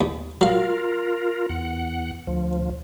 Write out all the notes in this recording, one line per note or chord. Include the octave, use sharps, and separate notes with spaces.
D#2
F#3 F4 A#4 F5
E2 F#5
D2 F3